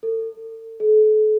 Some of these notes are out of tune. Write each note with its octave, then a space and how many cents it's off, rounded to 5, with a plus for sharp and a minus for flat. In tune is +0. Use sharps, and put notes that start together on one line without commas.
A4 +40
A4 -40